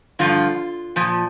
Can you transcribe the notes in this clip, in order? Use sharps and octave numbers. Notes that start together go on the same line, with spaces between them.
G2 D3 F3 F4
A#2 F3